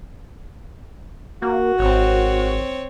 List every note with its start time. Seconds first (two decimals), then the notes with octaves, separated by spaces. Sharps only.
1.42 A#3 F#4
1.79 G#1 C4 C#5